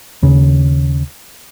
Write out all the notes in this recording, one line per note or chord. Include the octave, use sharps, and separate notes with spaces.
D#2 C#3